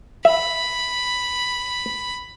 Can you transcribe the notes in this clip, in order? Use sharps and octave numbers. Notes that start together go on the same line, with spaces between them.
E5 B5